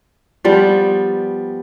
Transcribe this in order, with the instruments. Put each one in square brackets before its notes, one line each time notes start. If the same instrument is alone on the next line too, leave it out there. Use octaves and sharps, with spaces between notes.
[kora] F3 G3 B3